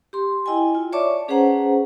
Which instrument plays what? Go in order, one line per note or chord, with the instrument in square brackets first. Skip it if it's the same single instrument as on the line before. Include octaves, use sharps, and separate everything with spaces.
[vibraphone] G4 C6
E4 D#5 G5 G#5
F4
C#5 D5 E5 A5 C#6 D6
C#4 G#4 B4 C5 F#5 A#5